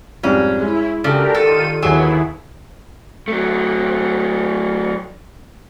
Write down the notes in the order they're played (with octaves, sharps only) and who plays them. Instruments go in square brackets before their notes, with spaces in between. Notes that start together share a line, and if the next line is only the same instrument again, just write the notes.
[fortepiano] F2 G#2 G3 [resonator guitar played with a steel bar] C#4
[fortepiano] G#3 [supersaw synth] E4
[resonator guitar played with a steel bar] C#3 [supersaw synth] D4 G4 A#4 [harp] F#4 A4 D5
[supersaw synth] D#3 F4 D#7 [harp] G4 [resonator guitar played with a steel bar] A4
[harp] D#2 E7 [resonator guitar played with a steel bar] F#3 [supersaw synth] B3 E4 [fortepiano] G#4 G#5
[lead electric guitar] F#3 A3